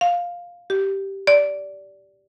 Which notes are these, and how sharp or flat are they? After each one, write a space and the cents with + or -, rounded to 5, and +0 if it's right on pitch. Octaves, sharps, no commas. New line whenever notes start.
F5 +5
G4 -10
D5 -15